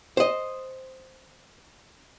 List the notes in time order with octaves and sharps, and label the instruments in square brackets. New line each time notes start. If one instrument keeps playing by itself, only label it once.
[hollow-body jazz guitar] C5 D#5